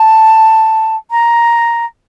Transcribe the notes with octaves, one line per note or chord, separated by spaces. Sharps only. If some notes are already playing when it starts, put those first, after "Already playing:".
Already playing: A5
A#5